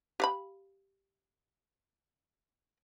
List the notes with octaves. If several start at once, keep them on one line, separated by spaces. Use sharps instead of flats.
G4 F5 B5